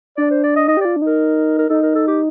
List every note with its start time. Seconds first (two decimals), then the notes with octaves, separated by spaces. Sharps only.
0.17 D4 D5
0.30 C5
0.43 D5
0.56 D#5
0.68 D#4 D#5
0.77 G4
0.81 F4 D5
0.96 D4
1.02 D#4 A#4
1.59 A#4
1.70 D#4 A4
1.83 A#4
1.95 A4
2.07 G4